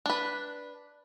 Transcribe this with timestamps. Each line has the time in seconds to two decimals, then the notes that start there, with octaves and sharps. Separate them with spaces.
0.06 D4 B4